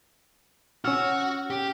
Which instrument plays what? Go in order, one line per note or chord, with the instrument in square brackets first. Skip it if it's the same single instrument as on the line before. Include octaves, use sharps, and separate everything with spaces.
[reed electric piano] C#4 E6 F6 [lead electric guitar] F#4
[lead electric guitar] G4